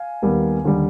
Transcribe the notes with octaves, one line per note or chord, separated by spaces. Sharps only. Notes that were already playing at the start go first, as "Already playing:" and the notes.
Already playing: F5 G#5
D#2 D#3 G3 B3
D#2 D3 G3